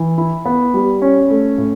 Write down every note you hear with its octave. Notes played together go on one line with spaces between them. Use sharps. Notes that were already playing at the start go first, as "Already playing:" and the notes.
Already playing: E3
E4
B3
G3
C#4
A3
A2